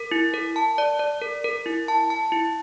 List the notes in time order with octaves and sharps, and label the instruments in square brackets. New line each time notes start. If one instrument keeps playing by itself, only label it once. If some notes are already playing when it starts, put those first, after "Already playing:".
Already playing: [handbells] A#4
E4
A#4
A5
D5
D5
A#4
A#4
E4
A5
A5
E4